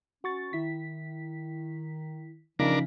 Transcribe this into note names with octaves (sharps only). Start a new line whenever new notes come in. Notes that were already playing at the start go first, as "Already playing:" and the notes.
C#4 F#4 C#6 A6
D#3 E4 B6
C#3 E3 F3 D4 D#4 A#4 B6